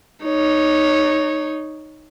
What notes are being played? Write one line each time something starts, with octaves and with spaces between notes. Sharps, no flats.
D#4 C#5